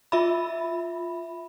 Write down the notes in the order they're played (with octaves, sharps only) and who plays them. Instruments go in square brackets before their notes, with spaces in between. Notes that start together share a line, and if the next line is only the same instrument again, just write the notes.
[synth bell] F4 E5 B5